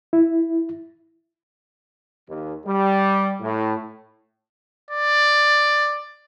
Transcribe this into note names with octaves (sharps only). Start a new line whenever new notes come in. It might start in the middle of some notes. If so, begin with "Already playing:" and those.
E4
D#2
G3
A2
D5